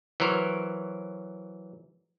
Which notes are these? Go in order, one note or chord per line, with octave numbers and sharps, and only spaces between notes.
E3 F#3 A#4 C5 C#5